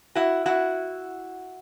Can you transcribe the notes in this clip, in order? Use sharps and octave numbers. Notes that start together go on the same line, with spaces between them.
E4 F#4
E4 F#4